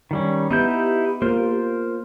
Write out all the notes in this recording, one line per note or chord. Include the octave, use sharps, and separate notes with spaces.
D#3 G3 C#4
B3 D#4 E4 G4 G6
A#3 F4 A#4 C5